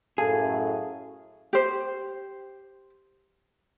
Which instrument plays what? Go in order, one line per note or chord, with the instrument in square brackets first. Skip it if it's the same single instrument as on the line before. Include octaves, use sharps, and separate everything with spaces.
[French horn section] F#2 A2 [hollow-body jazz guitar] G#4 [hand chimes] A4 F5 A5
[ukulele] G4 C5